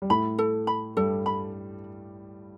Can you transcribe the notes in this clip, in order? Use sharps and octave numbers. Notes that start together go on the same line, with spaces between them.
G3
A2 A3 B5
A4
B5
G2 G3 A4
B5